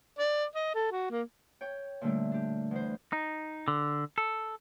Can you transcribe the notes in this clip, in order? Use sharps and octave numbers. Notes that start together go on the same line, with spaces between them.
D5
D#5
A4
F#4
A#3
C#5 G5
A#2 D3 G3 A3
D4 G4
E2 C5
D#4
D3
A4